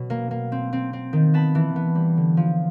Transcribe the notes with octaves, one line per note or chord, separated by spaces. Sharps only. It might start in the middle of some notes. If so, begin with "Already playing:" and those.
Already playing: B2 F#3
A#3
A#3
C4
C4
C4
D#3
B3 A5 B5
E3
B3
G3
D3
F3